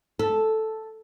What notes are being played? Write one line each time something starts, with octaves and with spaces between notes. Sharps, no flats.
A4